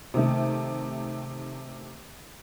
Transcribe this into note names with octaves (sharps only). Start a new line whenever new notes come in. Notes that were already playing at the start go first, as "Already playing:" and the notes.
C3 D#3 A3